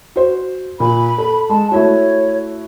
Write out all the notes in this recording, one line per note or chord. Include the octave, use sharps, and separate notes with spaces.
F#4 C5
A#2 B5
A4
G#3 A5
A3 E4 F#4 C#5